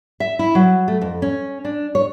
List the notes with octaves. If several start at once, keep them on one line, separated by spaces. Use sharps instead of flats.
E5
E4
F#3
A3
F2
C#4
D4
C#5